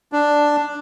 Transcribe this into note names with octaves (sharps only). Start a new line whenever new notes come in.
D4